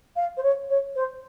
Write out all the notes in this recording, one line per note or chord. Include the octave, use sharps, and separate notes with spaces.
F5
C5
C#5
C#5
C5